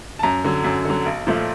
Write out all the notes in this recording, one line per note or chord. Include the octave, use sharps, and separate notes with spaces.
A5
F#2 A#5
D3 F#3
F#2
D3 F#3
B1
A#2 F3 A3